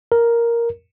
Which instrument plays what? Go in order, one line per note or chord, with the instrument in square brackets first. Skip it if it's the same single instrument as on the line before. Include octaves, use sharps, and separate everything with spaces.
[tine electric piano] A#4